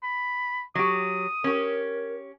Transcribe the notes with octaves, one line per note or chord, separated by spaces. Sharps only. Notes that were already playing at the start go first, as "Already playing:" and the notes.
B5
F#3 G4 D#6
C#4 G4 A#4